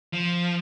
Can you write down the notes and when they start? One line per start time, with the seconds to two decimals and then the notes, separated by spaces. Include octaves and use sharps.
0.13 F3